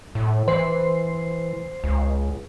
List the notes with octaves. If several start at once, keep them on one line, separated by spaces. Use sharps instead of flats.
A2
E3 C5 C7
C#2